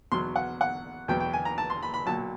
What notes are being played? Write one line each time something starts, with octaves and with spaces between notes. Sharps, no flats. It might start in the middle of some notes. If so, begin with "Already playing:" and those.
E2 B2 F#3 C6
F#5
F#5
E2 B2 F#3 G5
G5
G#5
A#5
A5
C6
B5
B5
B1 A#2 F#3 A5